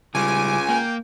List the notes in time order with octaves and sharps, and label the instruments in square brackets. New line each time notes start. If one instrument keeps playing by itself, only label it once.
[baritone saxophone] C#2 [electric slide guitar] C#3 G3 [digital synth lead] G#5 [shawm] D6
[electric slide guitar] A#3 [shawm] G5